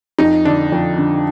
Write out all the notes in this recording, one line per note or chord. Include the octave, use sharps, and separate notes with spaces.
F2 D#4
D3 D4
F2
D3